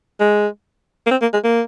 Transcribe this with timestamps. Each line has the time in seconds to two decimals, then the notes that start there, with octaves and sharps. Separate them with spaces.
0.20 G#3
1.06 A#3
1.11 C4
1.22 A#3
1.33 G#3
1.44 A#3